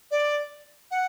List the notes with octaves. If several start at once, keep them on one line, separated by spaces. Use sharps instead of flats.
D5
F#5